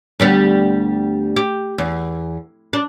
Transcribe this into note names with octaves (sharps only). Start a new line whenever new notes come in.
D2 G3 B3
G4
E2
D4